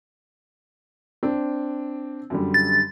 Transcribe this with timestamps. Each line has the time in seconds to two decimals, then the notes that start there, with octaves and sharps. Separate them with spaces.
1.23 C4 D4
2.30 F#2 D3 G3
2.54 A6